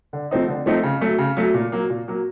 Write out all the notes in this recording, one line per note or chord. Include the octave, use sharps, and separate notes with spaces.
D3
F3 A3 C4 D#4
D3
F3 A3 C4 D#4
C#3
F#3 A3
C#3
F#3 A3
A#2
F#3 A#3
A#2
F#3 A#3